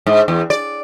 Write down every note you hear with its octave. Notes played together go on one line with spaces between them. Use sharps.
G#2
E2
D5